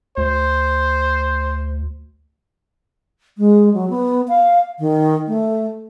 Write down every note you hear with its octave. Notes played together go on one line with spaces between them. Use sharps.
D2 C5
G#3
F#3
B3
F5
D#3
A3